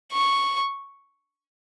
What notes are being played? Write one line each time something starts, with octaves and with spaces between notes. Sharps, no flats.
C#6